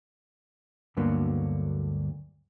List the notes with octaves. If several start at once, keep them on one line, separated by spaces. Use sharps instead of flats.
D2 G2 D3 F#3 A#3 B3